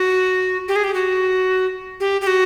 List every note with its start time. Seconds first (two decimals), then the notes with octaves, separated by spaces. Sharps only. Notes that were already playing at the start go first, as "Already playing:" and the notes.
Already playing: F#4
0.68 G4
0.76 G#4
0.84 G4
0.94 F#4
2.00 G4
2.21 G4
2.27 F#4